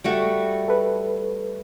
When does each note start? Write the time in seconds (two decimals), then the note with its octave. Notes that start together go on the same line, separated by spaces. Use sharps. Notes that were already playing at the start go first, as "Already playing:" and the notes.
0.04 G3 A3 F#4
0.68 A4 B4